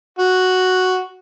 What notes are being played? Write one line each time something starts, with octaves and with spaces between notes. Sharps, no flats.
F#4